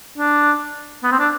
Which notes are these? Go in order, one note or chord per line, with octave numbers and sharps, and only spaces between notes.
D4
B3
C4
D4